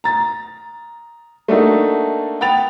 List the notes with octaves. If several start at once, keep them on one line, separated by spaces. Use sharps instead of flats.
A#5 A6
A3 A#3 D4 D#4 F#4 A4
F#5 G5 B5 A6 F7